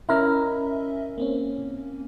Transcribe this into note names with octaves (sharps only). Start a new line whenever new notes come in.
C#4 E4 A#4 D#5 E5
A#3 C4 C#4